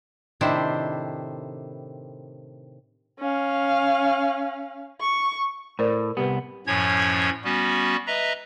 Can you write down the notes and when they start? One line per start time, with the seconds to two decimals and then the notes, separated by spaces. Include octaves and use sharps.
0.41 A2 C3 D#3 D4 E4 C5
3.20 C#4 F5
5.01 C#6
5.79 A2 A#4 C5 D5
6.17 C2 B3 G4 B4
6.67 F#2 A2 F3 C#4 C#5 G#6
7.44 G3 B3 C#4 F#4
8.07 B4 D#5 E5 A#5